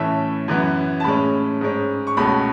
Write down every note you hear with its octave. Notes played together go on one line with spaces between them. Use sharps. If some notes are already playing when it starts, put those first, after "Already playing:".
Already playing: A2 E3 A3 C#4 E5
F#2 E3 B3
A5
A2 G#3 C#4 B5
G#2 G#3 C#4
C#6
C#2 B2 A3 C#4 B5